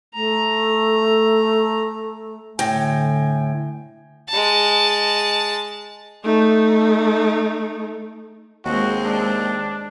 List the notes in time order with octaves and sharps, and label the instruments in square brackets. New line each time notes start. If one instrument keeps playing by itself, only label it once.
[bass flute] A3 [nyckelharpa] A#5
[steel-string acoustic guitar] A2 [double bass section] D3 [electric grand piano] G5 A#6 [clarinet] G#5
[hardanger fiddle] G#3 A5
[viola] A3 D#4
[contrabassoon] D#2 [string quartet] G#3 C4 [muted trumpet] F#4
[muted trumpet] D4